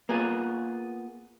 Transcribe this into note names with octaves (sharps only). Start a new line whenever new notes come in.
A#3 B3 F4 G#4